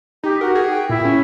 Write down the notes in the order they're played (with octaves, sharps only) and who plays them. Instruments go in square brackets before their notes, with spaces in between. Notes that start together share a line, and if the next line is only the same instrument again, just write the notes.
[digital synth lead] D#4 [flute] G4
[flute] F#4 [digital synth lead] A#4
[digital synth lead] G#4
[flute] G5
[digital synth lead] A#2 [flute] E4
[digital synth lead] C#4